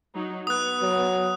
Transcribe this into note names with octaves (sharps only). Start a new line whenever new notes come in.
F#3 D#4
B3 D#6 F#6
F#3